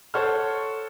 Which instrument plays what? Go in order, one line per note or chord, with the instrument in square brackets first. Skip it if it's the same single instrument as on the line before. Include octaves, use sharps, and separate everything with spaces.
[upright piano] A4 C5 C#5 F#5 C#6 F6